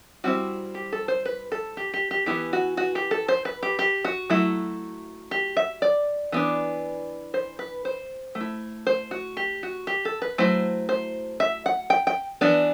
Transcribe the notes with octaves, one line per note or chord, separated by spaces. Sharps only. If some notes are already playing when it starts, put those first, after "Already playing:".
G3 C4 E4 F#4
G4
A4
C5
B4
A4
G4
G4
G4
E3 B3 E4 G4
F#4
F#4
G4
A4
C5
B4
G4
G4
F#4
F#3 A3 E4
G4
E5
D5
E3 B3 D4
C5
B4
C5
A3
E4
C5
F#4
G4
F#4
G4
A4
B4
F#3 A3 E4 C5
C5
E5
F#5
G5
G5
E3 B3 D4